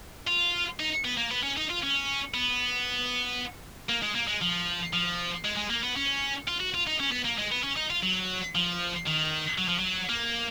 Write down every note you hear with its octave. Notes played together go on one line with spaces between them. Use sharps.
F4
D#4
B3
A#3
B3
C#4
D#4
F4
C#4
B3
A#3
G#3
A#3
G#3
F3
F3
G#3
G#3
A#3
B3
C#4
F4
F#4
F4
D#4
C#4
B3
A#3
G#3
B3
C#4
D#4
F4
F#3
F3
D#3
F#3
F3
F#3
A#3